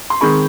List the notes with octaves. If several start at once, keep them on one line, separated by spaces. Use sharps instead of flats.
C6
D#3 G#3 C4 B5 C#6